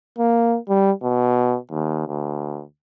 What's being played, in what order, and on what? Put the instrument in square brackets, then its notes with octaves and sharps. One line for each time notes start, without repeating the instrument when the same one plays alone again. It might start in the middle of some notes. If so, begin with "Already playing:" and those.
[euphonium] A#3
G3
B2
D#2
D2